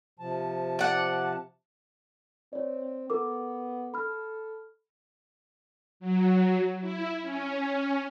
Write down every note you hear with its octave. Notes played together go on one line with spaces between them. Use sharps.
C3 F3 A5
D5 F#5
C4 C#5 D5
B3 A4 A#4 D6
A4 B5 F6
F#3
E4
C#4